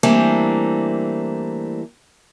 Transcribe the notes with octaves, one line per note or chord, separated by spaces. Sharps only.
E3 G3 A3 A#3 C4 D4